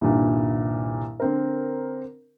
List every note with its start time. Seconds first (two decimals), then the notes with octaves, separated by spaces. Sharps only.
0.01 C2 G2 A#2 D#3
1.20 D3 C4 A#4